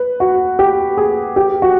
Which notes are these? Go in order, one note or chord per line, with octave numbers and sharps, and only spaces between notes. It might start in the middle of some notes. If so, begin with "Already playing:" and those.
Already playing: B4
F#4
G4
G#4
G4
F#4